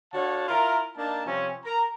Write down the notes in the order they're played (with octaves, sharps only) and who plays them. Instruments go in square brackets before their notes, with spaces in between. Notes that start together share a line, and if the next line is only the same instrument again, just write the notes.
[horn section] D3 F#4 C#5 F5 A5
E4 F4 A#4
A#3 D4 D#4 A5
C3 F3 G3 C4 C#4
A#4 A#5